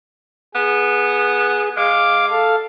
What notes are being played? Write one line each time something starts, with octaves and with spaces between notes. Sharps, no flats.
B3 G#4
G#3 F5 D6
A4 F5